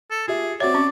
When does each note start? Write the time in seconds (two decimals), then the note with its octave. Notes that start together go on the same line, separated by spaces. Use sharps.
0.11 A4
0.28 F4 G4 G#4 E5
0.60 C4 F#4 C#5 D5 E5
0.74 C#4 C#6